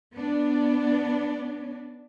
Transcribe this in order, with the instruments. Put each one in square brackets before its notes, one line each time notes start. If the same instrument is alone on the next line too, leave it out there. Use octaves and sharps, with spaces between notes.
[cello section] B3 D4